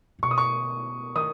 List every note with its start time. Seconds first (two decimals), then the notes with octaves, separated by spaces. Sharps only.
0.19 A#2
0.23 B2 C#6
0.31 D#6
0.38 C#6
1.15 D#3 D#6